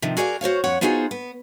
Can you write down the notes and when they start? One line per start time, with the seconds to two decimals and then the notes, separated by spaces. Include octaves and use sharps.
0.02 C3 D#3 F3
0.17 F#4 G#4 A#4 D5 E5 F5
0.41 F#4 C5 C#5 F5
0.64 F2 C#5 F#5
0.81 B3 D#4 F4 F#4 G#4 C5
1.11 B3